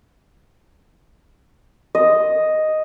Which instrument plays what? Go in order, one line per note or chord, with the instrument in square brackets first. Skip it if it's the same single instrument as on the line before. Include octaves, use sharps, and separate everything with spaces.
[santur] D#5